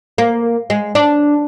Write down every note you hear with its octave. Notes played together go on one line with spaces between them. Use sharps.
A#3
G#3
D4